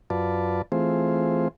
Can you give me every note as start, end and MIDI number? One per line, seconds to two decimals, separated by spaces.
0.10 0.62 42
0.10 0.62 65
0.10 0.62 71
0.10 0.62 74
0.10 0.62 81
0.72 1.48 52
0.72 1.48 57
0.72 1.48 60
0.72 1.48 65
0.72 1.48 68
0.72 1.48 72